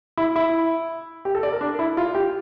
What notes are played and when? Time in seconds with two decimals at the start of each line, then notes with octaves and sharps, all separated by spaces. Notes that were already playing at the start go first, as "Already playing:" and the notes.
0.17 E4
0.36 E4
1.25 G4
1.35 A4
1.43 D5
1.52 A#4
1.61 D4
1.79 E4
1.97 F4
2.15 G4